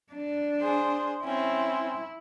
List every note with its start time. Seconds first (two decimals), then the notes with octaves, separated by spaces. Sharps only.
0.13 D4
0.62 G#4 C5
1.24 C4 C#4 E4